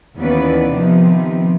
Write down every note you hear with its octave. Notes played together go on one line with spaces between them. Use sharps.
D#2 E3 B3 C#4 B4 D5
C3 D#3 F3 B3